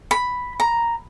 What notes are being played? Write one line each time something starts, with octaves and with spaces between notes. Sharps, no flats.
B5
A#5